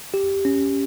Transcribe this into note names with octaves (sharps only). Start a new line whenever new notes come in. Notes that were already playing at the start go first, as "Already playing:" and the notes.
G4
C#4